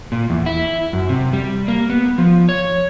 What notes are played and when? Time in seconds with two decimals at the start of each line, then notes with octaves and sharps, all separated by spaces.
0.12 A#2
0.30 E2
0.46 E4
0.93 F#2
1.09 C3
1.33 G3
1.68 A#3
1.90 B3
2.18 F3
2.49 C#5